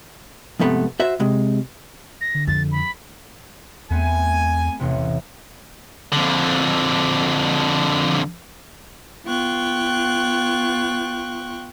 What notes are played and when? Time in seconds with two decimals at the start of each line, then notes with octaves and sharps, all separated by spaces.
0.60 F2 G#2 C3 A3 B3
1.00 F#4 C5 E5
1.20 C3 G#3
2.21 A#6
2.35 D3
2.47 F2 A6
2.71 B5
3.90 E2 A3 B3 C4 G#5
4.80 A1 E2 C3
6.13 F2 D3
9.26 B3 F4 G5 C#6 F#6